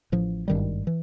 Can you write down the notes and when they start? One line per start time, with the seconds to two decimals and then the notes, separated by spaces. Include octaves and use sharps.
0.12 A1 A2 F3
0.48 G#1 G2 D#3 G3
0.87 E3